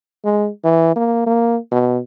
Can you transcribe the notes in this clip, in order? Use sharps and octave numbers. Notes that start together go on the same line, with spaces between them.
G#3
E3
A#3
A#3
B2